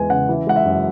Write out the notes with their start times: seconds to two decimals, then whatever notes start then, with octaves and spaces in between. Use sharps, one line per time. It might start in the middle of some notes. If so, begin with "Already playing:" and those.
Already playing: E2 G#3 B3 G#5
0.10 C#3 F#5
0.29 E3
0.47 G#3 F#5
0.56 E5
0.65 F#2